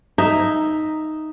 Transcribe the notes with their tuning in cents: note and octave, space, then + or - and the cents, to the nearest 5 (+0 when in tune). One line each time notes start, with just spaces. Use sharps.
D#4 +0 E5 +0